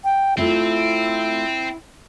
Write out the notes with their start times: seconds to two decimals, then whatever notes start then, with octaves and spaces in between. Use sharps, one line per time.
0.04 G5
0.37 A3 C4 E4 F4 A4